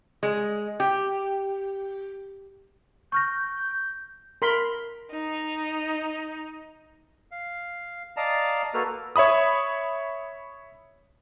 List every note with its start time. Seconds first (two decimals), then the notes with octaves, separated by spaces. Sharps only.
0.23 G#3
0.80 G4
3.12 C#6 F6 G6 A#6
4.42 A#4 B5 C6
5.12 D#4
7.31 F5
8.17 D5 D#5 F5 A5 A#5
8.74 A#3 F#4 A4 B4 F6
9.16 C#5 E5 B5 D#6